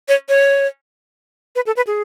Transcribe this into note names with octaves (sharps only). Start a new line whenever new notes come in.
C#5
C#5
B4
A4
B4
G#4